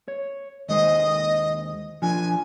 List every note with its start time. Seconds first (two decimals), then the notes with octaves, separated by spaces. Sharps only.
0.08 C#5
0.69 D#2 G#3 C5 D#5
2.02 F3 D4 G#5